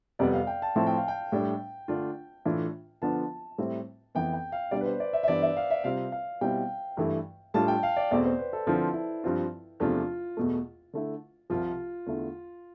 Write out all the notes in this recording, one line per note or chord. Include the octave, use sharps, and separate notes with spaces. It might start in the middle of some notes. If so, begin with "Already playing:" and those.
F2 C3 G3 B3 D5
F5
G5
A5
A2 F3 C4 E4 A5
G5
F5
G5
A2 G3 D4
D3 A3 D4 F4
A2 E3 A3 D4 F4
D3 F3 B3 D4 F4 A5
A2 G3 C4 E4
F2 E3 B3 G5
G5
F5
B2 G3 B3 D4 D5
B4
C5
D5
E5
E5
G2 E3 B3 D4 D5
E5
F5
E5
C3 G3 C4 F4 F5
F5
B2 G3 C4 E4 G5
G2 E3 A3 E4
A2 G3 D4 F4 A5
G5
F5
D5
E2 B2 A3 C4 D5
C5
B4
A4
D3 F3 C4 E4 F4
E4
G2 F3 C4 F4
E2 C3 F3 A3 D4 F4
E2 B2 A3
D3 A3 E4
C2 C3 F3 F4
E2 D3 A3 E4